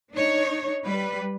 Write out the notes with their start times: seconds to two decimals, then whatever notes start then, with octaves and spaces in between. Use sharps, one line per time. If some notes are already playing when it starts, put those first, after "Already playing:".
0.11 D4 D#4 C#5
0.85 G3 B4